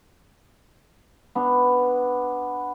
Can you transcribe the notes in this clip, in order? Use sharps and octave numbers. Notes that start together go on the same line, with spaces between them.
B3 D4